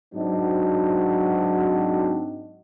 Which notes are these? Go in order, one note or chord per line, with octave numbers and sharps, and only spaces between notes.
G#2 F#3 C4 D4 D#4 F#4